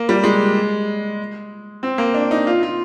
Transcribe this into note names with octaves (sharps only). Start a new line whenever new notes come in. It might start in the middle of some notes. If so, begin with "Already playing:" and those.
Already playing: A#3
G3
G#3
C4
A#3
D4
D#4
F4
F4